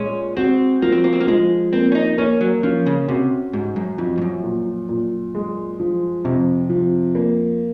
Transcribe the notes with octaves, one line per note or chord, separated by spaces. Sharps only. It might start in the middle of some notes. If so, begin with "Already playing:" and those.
Already playing: A#2 G#3 C#4
C4 F#4
F3 A#3
C4
A#3
C4
A#3
F3 G#3
A#3 C4
C#4
D#4
A#3 C#4
F#3
F3 C#4
C#3
C3 F#4
G#2 F#4
F#2
F2 F3
G#2
F#2
A#2
A#2
G#3
F3
F2 C3
F3
A#3